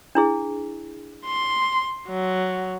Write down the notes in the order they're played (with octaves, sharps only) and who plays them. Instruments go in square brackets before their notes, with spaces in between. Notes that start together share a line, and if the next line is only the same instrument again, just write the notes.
[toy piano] D4 E4 G#4
[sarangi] C6
F#3